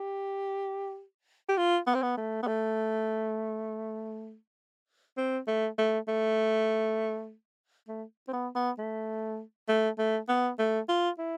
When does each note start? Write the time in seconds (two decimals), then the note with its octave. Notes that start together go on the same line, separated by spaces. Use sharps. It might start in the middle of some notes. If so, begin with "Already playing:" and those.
Already playing: G4
1.49 G4
1.57 F4
1.87 B3
1.95 C4
2.03 B3
2.17 A3
2.43 B3
2.47 A3
5.18 C4
5.48 A3
5.78 A3
6.08 A3
7.88 A3
8.28 C4
8.33 B3
8.55 B3
8.79 A3
9.69 A3
9.98 A3
10.29 B3
10.59 A3
10.89 F4
11.18 E4